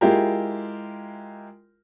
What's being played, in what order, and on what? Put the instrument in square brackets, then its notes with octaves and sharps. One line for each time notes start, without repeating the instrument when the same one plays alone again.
[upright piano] G#3 E4 F4 G4 A#4